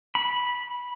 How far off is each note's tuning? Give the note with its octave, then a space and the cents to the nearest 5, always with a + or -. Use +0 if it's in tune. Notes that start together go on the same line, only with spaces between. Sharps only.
B5 -10